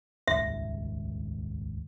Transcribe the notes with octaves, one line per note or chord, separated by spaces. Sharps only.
D#1 G#1 C#2 E5